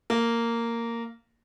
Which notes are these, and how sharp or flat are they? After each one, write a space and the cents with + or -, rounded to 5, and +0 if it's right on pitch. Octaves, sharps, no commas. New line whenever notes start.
A#3 -10